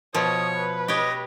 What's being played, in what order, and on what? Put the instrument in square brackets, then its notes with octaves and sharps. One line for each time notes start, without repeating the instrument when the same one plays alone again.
[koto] B2 F3 [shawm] C#5 [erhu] D#6
[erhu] B4
[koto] G4 C#5 [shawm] D#5